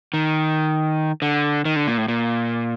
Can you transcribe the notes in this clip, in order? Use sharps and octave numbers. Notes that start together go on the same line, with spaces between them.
D#3
D3
D#3
D3
A#2
A2
A#2